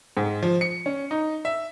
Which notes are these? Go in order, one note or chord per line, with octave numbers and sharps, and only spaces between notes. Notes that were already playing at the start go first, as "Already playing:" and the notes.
G#2
F3
C#7
C#4
D#4
E5